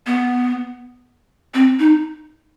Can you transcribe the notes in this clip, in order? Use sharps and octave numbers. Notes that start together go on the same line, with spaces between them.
B3
C4
D#4